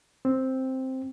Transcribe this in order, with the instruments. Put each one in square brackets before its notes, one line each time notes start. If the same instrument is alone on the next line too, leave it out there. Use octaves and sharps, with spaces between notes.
[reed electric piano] C4